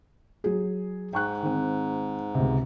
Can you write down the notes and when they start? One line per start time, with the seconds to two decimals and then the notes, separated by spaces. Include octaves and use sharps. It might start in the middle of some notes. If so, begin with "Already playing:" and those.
0.44 F#3 G#4
1.13 G#2 G5 C#6 F#6
1.42 D#3 C4
2.35 C#2 C3